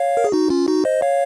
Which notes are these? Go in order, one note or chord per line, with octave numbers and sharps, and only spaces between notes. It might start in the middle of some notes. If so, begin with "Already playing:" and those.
Already playing: C#5 F5
A#4
G#4
D#4 F#4
C#4 F4
D#4 F#4
C5 D#5
C#5 F5